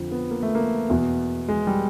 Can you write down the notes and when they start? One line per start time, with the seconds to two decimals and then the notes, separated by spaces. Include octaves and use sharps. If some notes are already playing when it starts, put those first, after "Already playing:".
Already playing: F2 D3 F3
0.12 B3
0.31 A#3
0.43 A3
0.55 A#3
0.90 E2 B2
1.48 G#3
1.67 G3